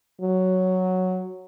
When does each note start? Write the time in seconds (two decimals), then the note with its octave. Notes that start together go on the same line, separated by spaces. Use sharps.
0.21 F#3